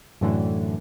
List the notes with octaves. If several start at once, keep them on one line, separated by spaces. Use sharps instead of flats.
F#2 A2 D3 E3